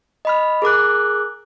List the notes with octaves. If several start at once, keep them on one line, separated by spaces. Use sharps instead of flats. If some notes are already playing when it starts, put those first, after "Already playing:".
D#5 B5 F6
G#4 A#4 D6 F#6